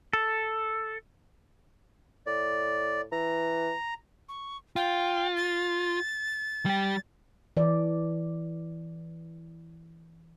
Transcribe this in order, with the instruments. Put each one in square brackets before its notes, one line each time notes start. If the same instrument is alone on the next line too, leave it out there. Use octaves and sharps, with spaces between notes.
[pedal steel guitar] A4
[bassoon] A2 [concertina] D5
[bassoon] E3 [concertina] A#5
[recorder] C#6
[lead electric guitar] F4 [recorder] G5
[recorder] A6
[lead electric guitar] G3 G4
[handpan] E3 D5